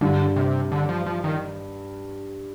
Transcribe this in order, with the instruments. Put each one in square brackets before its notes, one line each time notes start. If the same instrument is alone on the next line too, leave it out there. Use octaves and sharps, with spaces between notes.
[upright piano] G2 [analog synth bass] D3
[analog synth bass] C3
D3
F3
F3
D#3